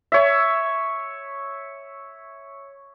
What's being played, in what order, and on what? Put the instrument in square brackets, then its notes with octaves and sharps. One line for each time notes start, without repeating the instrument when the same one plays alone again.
[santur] C#5 E5